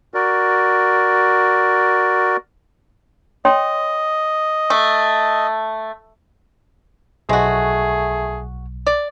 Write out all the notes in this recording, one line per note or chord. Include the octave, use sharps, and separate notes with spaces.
F#4 A#4 D5
C#5 D#5 G5 C6
A3
B1 G#3 A3 F#4 G#4
D5